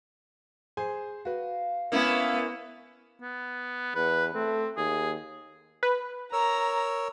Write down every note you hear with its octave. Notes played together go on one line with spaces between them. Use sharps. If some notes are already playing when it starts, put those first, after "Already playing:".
G#4 C5 G#5
F#4 B4 F5
A#3 B3 C#4 E4
B3
E2 B4
A3 C4
D#2 G#4
B4
A#4 C#5 A#5 E6